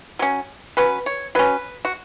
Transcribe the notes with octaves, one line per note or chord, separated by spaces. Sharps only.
F#3 C#4
F#3 C#4 B4
C#5
F#3 C#4 B4
F#4